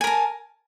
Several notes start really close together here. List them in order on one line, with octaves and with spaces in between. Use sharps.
G#5 A#4 A5